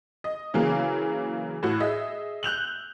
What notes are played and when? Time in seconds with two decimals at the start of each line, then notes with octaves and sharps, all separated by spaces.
0.24 D#5
0.54 C#3 E3 F#3 A#3
1.63 A2 F#4
1.80 G#4 D#5 E5
2.43 F#6 G6 F7 F#7